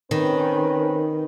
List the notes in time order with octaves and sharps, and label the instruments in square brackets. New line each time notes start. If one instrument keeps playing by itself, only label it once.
[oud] D#3 [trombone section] C4 C#4 B4